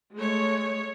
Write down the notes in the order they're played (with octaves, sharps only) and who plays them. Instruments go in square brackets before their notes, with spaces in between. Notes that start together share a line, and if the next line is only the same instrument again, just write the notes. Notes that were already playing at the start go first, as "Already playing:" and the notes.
[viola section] G#3 A3 C#5